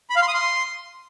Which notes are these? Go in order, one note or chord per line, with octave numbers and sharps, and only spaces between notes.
B5
F5
C6
D#6
C6